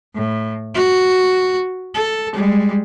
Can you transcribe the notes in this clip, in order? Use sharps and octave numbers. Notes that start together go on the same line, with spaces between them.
A2
F#4
A4
G3 G#3